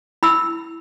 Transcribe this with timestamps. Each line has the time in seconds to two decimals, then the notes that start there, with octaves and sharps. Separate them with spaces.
0.23 E4 B5 E6